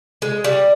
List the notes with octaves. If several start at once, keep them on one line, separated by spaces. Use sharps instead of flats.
G#3
G3